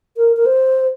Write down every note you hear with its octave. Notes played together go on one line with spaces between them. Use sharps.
A#4
A#4
C5